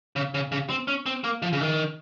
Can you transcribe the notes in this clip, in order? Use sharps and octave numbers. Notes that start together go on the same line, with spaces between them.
C#3
C#3
C#3
C4
C#4
C4
A#3
F3
C#3
D#3